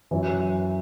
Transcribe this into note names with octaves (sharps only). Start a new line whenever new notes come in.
F#2 E3